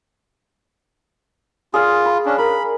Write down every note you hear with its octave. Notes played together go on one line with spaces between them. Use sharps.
F4 G#4 D5 F5
B5
C#4 D4
A#4 B5